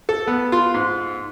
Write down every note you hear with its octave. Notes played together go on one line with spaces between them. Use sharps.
A4
B3
F4
G#2